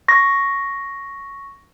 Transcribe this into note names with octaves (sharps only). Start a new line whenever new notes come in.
C#6 A#6